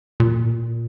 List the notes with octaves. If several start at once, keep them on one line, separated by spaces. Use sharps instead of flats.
A#2